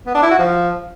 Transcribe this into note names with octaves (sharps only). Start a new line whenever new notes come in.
B3
D4
E4
F#4
F3